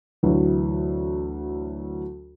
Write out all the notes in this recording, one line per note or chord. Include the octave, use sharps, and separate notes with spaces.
D2 E3 F#3